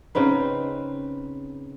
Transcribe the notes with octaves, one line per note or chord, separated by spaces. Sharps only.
C#3 C4 D#4 B4